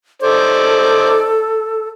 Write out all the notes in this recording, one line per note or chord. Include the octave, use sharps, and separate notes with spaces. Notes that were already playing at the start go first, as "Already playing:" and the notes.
D#4 A4 C5 D5